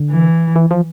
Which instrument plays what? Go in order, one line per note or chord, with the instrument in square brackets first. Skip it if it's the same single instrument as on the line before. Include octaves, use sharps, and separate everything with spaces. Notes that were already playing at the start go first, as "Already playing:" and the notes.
Already playing: [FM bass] D3
[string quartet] E3
[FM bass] E3
F3